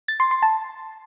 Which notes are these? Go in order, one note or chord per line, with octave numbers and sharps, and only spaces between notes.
A6
C6
C6
A5